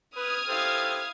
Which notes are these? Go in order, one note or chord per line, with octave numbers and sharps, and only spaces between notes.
B4 D#6 F6 G#6
E4 G4 A4 C5 F5